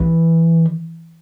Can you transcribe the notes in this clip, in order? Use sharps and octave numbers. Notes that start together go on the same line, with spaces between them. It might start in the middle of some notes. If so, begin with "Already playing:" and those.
Already playing: E3